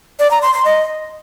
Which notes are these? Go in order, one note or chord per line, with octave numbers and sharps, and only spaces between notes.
D5
A#5
C6
C6
D#5